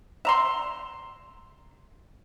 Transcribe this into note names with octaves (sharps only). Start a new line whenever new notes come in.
E5 A#5 C6